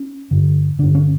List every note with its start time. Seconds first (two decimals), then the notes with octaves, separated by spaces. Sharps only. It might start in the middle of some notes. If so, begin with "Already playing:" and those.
Already playing: C#4
0.31 G2 D3
0.79 G2 D3 D4
0.95 C#4